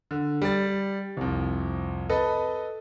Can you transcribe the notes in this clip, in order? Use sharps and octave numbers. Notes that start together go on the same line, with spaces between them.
D3
G3 A6
C2 F2
A4 B4 D#5